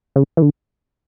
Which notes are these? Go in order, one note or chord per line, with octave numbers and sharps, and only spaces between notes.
C#3
E3
D3